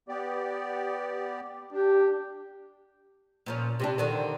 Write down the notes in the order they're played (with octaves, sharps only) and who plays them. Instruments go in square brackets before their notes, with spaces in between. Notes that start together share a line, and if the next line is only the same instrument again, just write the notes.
[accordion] B3 G4 D5
[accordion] D4 [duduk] G4
[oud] A#2 F3 C#4
C3 G3 D4
D3 D#3 C4